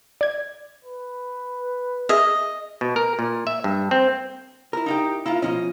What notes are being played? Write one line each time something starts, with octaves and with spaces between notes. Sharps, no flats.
D5 G#6
B4
G#4 D#5 E5 F6
B2
A#4
A#2
E5
G2
C4
E4 A#4
D#4 F4 G4
A#3 E4 F4
B2 F3 C#4 D#5